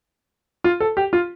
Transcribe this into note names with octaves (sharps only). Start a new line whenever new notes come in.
F4
A4
G4
F4